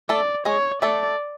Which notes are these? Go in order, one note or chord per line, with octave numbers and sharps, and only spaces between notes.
A3 A4 D5
G#3 G#4 C#5
A3 A4 D5